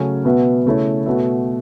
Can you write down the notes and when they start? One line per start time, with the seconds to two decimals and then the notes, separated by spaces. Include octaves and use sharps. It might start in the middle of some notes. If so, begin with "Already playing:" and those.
Already playing: C#3 F#3 A3 C#4
0.25 B2 B3 F#4 B4 E5
0.66 C#3 A3 E4 C#5
1.06 B2 A3 F#4 B4 E5